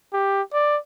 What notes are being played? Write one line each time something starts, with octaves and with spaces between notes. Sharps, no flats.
G4
D5